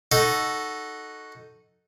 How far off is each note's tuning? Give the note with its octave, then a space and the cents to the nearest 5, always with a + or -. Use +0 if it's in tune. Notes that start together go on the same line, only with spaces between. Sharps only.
D#4 +0 F#4 +0 A4 +0